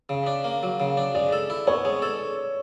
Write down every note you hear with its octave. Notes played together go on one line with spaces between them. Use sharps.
C#3
D4
A#3
F#3
C#3
D4
G#3 D5
A4
E4
B3 C#5
G#3
A4